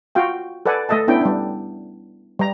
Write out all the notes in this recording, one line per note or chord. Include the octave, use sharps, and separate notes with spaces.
F4 F#4 F5 G5
A4 B4 D5 F#5 G#5
A3 A4 D#5 E5 A5
B3 C#4 D4 E4 G5
G3 D4
G3 A#5